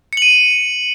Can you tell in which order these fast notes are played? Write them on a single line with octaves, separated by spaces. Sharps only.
C#7 F#7 D#7